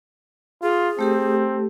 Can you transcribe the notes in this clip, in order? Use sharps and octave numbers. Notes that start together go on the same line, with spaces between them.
F4 G#4
A3 C4 G4 A4